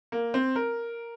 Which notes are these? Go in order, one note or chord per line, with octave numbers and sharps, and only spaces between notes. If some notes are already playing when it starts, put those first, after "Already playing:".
A#3
C4
A#4